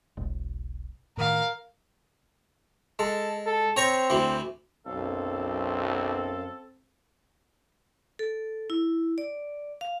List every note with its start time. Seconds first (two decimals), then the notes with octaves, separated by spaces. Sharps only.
0.17 E1 B1
1.17 A2 D#3 A#4 F5
2.99 G#3 A4
3.46 A4
3.77 C4 C#5 A#5 C#6
4.10 D2 E3
4.87 B1 F#2 C4 A4 F5
8.19 A4
8.70 E4
9.18 D5
9.81 F5